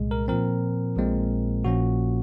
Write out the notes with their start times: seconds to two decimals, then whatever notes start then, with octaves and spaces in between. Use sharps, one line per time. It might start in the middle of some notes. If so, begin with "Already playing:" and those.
Already playing: C2 A#2 G#3
0.11 A#4
0.28 A#2 F3 C4 A#4
0.97 A#1 A#2 G#3 C4
1.64 A#1 A#2 F3 A#3 C#4 F#4